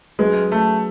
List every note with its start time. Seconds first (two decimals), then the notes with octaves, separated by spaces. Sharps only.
0.18 F#3 G#3 C#4 G#4 B4
0.52 A3